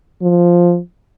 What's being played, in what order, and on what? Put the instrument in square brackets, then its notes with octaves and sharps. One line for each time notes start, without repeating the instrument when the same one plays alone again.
[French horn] F3